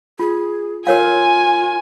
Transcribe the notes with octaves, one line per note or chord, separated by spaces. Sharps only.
F4 G#4
F4 A#4 C#5 F5 G#5